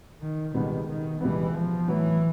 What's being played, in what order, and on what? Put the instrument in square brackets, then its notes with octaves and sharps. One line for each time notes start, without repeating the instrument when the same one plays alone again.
[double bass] D#3
[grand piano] C#2 B2 G3 B3 [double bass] D#3
[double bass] D#3
[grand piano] C#2 B2 G3 B3 [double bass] E3
[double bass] F3
[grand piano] A2 F#3 B3 E4 [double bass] E3